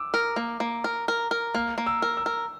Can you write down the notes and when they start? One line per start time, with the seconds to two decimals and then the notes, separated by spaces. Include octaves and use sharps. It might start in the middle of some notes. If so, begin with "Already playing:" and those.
Already playing: D6 E6
0.14 A#4
0.36 A#3
0.60 A#3
0.84 A#4
1.08 A#4
1.31 A#4
1.54 A#3 F6
1.78 A#3
1.87 E6
2.02 A#4
2.17 E6
2.26 A#4